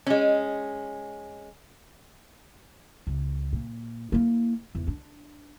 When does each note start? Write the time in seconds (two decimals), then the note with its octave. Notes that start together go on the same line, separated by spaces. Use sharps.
0.06 G#3 C#4
3.07 C#2
3.53 A#2
4.12 A#3 E4
4.75 E2 G#2
4.87 D4